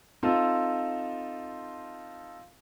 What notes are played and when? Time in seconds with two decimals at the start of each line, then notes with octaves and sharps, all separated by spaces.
0.23 C4 D#4 F4 A4